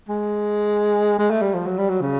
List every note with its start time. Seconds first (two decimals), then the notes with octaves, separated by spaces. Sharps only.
0.09 G#3
1.19 G#3
1.31 A3
1.42 G3
1.54 F3
1.66 F#3
1.78 G3
1.89 F#3
2.01 C#3